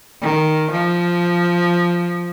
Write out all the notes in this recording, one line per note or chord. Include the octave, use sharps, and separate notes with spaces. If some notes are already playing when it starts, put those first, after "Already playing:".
D#3
F3